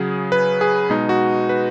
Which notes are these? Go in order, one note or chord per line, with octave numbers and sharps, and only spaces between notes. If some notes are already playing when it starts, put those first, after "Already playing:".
Already playing: C#3 F#3 G#4
B4
G#4
B2 G#3 D#4
F#4
B4